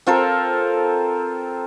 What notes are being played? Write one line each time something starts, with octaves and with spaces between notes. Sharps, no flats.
C4 F4 A4 A#4